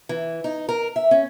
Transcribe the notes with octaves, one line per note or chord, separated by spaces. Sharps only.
E3
D#4
A#4
E5
C#4